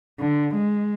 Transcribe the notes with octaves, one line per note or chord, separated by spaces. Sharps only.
D3
G#3